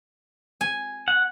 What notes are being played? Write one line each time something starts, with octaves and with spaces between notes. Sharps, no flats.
G#5
F#5